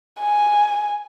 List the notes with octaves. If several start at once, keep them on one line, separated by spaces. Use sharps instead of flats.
G#5